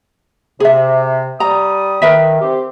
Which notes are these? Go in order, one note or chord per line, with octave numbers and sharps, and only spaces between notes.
C3 G#4 E5
G3 A#5 D#6
D#3 A#4 B4 E5
C4 G4